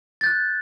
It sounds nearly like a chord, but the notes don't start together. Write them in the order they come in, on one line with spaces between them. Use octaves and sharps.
A6 G6 F#6